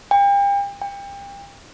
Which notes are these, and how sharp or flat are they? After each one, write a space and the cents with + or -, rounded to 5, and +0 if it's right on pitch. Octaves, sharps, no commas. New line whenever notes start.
G5 +40
G5 +30